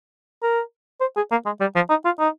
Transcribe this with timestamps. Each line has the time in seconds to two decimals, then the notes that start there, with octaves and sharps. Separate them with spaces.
0.42 A#4
1.00 C5
1.16 G#4
1.31 A#3
1.46 G#3
1.60 G3
1.75 F3
1.90 D#4
2.05 F4
2.19 D#4